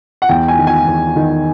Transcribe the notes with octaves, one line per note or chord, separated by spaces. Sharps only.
F#5
E2 G5
G#5
D#3
G#5
E2
D#3